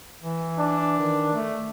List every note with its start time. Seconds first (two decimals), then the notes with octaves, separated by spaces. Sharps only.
0.22 E3
0.59 D4
1.00 D#3
1.34 A3